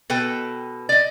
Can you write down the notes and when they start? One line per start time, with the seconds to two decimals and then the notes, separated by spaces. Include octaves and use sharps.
0.10 B2 A4 B4 G5
0.89 D5 D#5